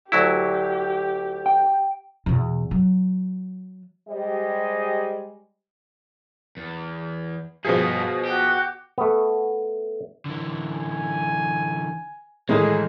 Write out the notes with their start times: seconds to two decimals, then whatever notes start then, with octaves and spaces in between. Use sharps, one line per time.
0.12 D2 F#3 E4 G4
1.46 G5
2.26 E2 B2
2.71 F#3
4.09 G3 G#3 G4 G#4 C5 D#5
6.57 E2
7.65 G2 B2 F3 B3 G#4
8.25 F#4 G4
8.98 A3 B3
10.25 D3 E3
10.70 G#5
12.49 A2 D#3 E3 G#3 A3 D#4 G#4